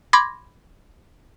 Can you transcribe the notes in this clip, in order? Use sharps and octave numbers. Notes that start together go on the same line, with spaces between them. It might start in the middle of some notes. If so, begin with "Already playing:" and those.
B5 C6 D6 G#6 A#6